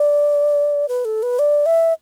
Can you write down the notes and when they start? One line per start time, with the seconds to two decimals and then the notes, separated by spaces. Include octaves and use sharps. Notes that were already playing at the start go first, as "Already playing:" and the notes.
Already playing: D5
0.88 B4
1.05 A4
1.23 B4
1.39 D5
1.66 E5